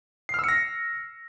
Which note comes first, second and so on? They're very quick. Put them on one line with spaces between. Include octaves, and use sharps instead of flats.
C7 F6 E6 C#7 A#6